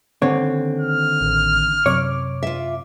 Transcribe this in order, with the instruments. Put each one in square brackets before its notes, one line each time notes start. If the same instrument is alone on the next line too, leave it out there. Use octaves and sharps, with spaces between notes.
[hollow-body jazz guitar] D#2 D3 C#5 [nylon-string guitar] C4
[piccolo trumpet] F6
[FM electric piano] A1
[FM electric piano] F#2 C3 D6 [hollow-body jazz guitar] C#5
[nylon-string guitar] F4 E5